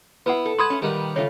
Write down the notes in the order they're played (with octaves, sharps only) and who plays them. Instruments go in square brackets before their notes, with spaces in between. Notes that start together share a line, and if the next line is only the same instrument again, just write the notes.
[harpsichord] B3 E4 [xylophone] B4 F#5
[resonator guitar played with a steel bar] A4
[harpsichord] B4 F#5 A5 [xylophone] C6 D#6 G#6
[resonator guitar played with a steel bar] A3 C#4
[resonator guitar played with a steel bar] A#2 B4 [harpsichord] D#3 G3 F#5
[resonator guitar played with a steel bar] C#3 A3 F4 [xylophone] C#5